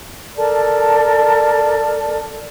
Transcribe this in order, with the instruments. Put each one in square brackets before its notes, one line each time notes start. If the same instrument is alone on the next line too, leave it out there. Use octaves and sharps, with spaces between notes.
[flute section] A4 A#4 D5 A5